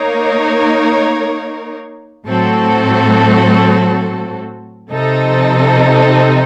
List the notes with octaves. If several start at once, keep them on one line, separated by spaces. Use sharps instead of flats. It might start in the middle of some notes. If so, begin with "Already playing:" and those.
Already playing: A#3 D#4 A#4 C#5
A2 F#3 C4 F#4 A4
C3 F3 C4 D#4 A4